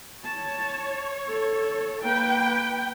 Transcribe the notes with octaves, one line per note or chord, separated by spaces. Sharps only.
C#5 A5
A4
A#3 B4 G5